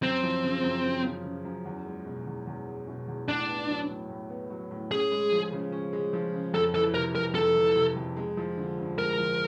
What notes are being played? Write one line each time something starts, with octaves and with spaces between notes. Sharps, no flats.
F#2 C4
F3
C#3
F#2
F#2
F3
C#3
F#2
E2
G#3
B2
E2
E2
G#3
B2
E2
A2 D4
B3
F#3
A2
A2
B3
F#3
A2
C#4 G#4
G#3
F3
C#3
C#4
G#3
F3
C#3
F2 A4
E3 A4
C3 A#4
F2 A#4
F2 A4
E3
C3
F2
G#3
F3
D3
G2
G#3 A#4
F3